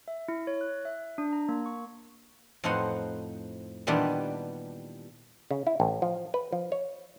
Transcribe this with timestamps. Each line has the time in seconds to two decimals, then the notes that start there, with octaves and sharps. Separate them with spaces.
0.08 E5
0.28 E4
0.47 C#5
0.61 F#6
0.85 E5
1.18 D4
1.33 A#5
1.49 A#3
1.66 C#6
2.64 F2 A2 D#4 C5 F#5
3.87 A#2 D#3 E3 G3 B3 D4
5.51 C#3
5.67 E4
5.80 A1
6.02 F3
6.34 B4
6.52 F3
6.72 C#5